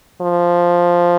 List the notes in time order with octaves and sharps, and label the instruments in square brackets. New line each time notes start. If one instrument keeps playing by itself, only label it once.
[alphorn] F3